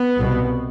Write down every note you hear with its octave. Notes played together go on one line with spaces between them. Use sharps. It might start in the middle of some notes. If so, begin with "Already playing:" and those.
Already playing: B3
C2 B2